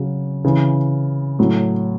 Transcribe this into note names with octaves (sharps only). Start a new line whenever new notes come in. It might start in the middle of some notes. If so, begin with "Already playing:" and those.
Already playing: C#3 F#3
C#3 E3
A2 F#3